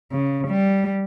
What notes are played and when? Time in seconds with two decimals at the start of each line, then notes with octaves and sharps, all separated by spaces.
0.11 C#3
0.48 G3